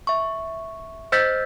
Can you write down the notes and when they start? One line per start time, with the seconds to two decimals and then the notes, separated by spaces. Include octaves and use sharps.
0.07 E5 C#6
1.12 C5 D#5 E6 G6 A6 B6